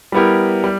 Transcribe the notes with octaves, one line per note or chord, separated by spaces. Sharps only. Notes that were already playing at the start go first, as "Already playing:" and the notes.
G3 B3 E4 G4 A#4
G3